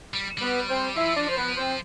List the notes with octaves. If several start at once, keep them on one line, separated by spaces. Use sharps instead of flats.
G3
G3 B3 B4
C4 C5
F3 E4 E5
D4 D5
C5
B3 B4
C4 C5